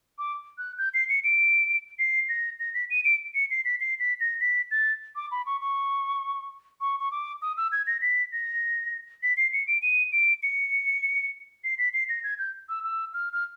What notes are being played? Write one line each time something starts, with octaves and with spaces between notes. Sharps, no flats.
D6
F#6
G6
C7
C#7
D7
C7
A#6
A#6
B6
D#7
D7
C#7
C7
B6
C7
B6
A#6
B6
A6
D6
B5
C#6
C#6
C#6
C#6
D6
D#6
E6
G#6
A#6
B6
A#6
B6
C7
C#7
D7
D#7
D7
C#7
C7
B6
C7
A#6
G#6
G6
E6
E6
F6
F6